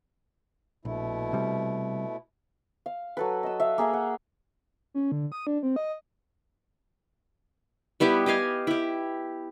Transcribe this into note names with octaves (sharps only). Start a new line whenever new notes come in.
A#1 B2 A3 E4
C3 G3
F5
F#3 A4 B4
D#5 E6
E5 F5
A#3 G#4 E5 A#5
F#5
C#4
D3
D#6
D4
C4
D#5
G3 B3 E4 G4
G4 D#5 F5 G#5
E4 G4